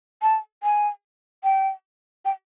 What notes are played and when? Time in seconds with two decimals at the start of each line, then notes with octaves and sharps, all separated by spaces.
0.22 A5
0.63 G#5
1.44 G5
2.25 G5